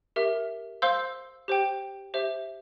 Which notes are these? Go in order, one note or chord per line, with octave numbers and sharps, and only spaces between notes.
G4 A#4 E5
C5 F5 C6 E6 G6
G4 C5 G5
G4 C5 E5